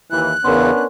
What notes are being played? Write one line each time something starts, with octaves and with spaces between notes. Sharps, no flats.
D#2 E3 F#6
E2 C#3 B3 C#4 D4 A#4 C#5 C6